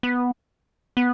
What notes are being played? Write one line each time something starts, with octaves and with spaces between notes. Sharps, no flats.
B3
B3